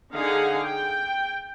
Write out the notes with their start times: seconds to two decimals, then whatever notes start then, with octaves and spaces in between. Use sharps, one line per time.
0.15 D3 D#4 G#4 F5 F#5
0.61 G5